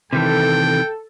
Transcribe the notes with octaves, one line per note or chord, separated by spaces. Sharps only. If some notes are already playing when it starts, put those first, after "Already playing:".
C3 D#3 E3 A4 G5